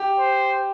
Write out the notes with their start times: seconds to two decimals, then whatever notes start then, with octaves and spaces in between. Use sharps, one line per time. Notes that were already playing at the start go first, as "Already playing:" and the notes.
Already playing: G4
0.19 C5